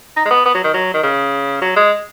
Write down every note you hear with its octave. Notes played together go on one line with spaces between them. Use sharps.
D#4
G#3
B3
B3
F#3
D#3
F#3
D#3
C#3
F#3
G#3